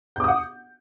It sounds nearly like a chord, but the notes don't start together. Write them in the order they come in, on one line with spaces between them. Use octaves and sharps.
G6 D6 D#6 F#5